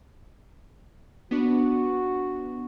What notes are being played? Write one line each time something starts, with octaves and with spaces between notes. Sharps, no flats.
B3 D4 F#4